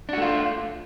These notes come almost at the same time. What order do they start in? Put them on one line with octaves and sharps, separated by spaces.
D4 F#4 A3 F4